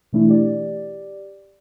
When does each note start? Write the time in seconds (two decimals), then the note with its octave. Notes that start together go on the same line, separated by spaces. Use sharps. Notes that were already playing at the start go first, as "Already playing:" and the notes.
0.13 B2 E3 A3 D4 E4
0.29 G4 D5